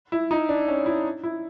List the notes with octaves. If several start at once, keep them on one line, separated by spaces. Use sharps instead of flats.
E4
D#4
D4
C#4
E4
E4